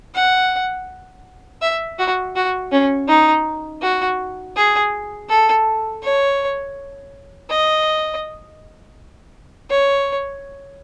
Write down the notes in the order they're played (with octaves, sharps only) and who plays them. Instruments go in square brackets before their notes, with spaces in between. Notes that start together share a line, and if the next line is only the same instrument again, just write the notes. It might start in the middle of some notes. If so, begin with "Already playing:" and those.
[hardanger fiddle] F#5
E5
F#4
F#4
C#4
D#4
F#4
G#4
A4
C#5
D#5
C#5